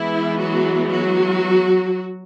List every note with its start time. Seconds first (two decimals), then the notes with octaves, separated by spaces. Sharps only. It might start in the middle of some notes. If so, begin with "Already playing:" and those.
Already playing: E3 G#3 B3 E4
0.38 F#3 F#4
0.91 F#3 F#4